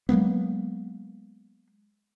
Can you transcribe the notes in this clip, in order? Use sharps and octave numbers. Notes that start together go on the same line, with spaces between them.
F#3 G#3 A#3 B3